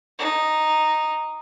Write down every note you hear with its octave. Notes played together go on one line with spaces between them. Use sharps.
D#4